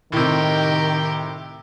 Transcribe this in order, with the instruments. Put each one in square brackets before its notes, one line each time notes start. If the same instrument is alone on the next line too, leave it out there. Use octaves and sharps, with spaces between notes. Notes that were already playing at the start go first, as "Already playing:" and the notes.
[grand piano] A2 C3 [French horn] D#3 [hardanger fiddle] G4 A#4